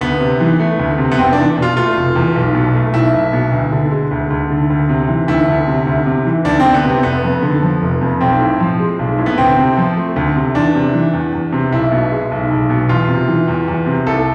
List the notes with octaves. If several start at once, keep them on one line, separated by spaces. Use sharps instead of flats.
D2 B3
C3
E3
A3
D2
C3
B3
F1 C4
E2 D4
B2 F4
A3 F4
F1
E2
B1
B2
A3
B1 E4
B1
B2
D2
D3
G#3
D2
D2
D3
D2
C3
E3
D2 E4
D2
C3
D2
C3
E3
D2 D4
C4
D2
B3
C3
C4
F1 B3
F2
D3
F3
F1
F2
B1 C4
A2
F3
G#3
B1
A2
B3
D2 C4
C3
F3
A3
D2
C3
E2 D4
C3
E3
E2
E2
C3
B1 E4
B2
G#3
B1
B1
B2
E2 F4
C3
E3
E2
E2
C3
C2 A4